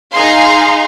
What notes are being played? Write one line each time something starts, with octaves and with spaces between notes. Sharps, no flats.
D#4 G#4 F5 A#5 C6